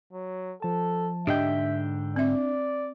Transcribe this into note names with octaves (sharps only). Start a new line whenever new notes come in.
F#3
F3 A4 A5
G#2 D3 D4 G4 D#5 E5 G5
C4 D5 E5